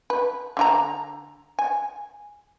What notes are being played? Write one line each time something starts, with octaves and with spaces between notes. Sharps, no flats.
B4
D3 F4 A#5
G#5